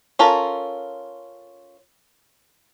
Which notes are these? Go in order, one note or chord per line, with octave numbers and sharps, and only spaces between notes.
C#4 F4 A4 A#4